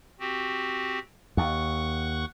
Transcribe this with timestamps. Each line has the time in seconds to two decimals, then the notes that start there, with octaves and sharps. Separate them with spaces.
0.20 C4 F#4 G4
1.37 D#2 F#5 C#6 F#6